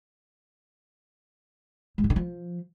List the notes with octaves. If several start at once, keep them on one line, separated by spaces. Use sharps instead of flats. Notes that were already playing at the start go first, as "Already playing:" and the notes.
G#2
E3
D3
F3